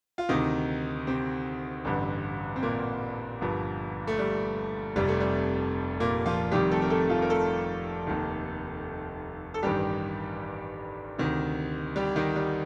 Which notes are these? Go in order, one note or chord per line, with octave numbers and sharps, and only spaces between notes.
F4
D2 C3 D#3 D#4
C3 C4
A1 G2 D3
C4
A#2 A#3
G1 G2 F3
A3
G3
F1 F2 C3 G3
A3
G3
A#2 A#3
F3 F4
F1 F2 C3 D#3 G3 G4
A3 A4
A#4
A3 A4
F3 F4
A#4
A3 A4
F1 D#2 D#3
A4
A1 G2 D#3 G3 G4
D2 C3 D#3
G3 G4
D#3 D#4
G3